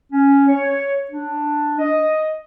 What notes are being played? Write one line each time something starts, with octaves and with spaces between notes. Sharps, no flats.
C#4
C#5
D4
D#5